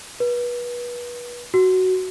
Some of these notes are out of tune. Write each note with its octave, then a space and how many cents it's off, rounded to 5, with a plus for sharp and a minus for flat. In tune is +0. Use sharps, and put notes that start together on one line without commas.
B4 -30
F#4 +10